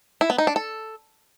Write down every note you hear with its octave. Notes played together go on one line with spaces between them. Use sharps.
E4
B3
D#4
D4
A4